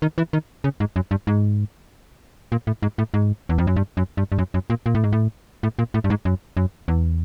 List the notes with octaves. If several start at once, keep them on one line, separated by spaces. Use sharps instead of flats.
D#3
E3
D#3
C#3
G#2
F#2
G2
G#2
A#2
A2
G#2
A2
G#2
E2
F2
F#2
G2
F#2
G2
G2
F#2
F#2
A#2
A#2
A2
G#2
A2
A2
A#2
A2
G2
G#2
F#2
F#2
E2